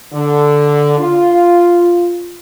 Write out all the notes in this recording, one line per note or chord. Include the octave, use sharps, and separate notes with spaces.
D3
F4